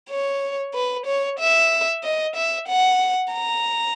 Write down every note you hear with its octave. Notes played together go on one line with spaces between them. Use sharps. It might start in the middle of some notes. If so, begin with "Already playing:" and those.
C#5
B4
C#5
E5
D#5
E5
F#5
A#5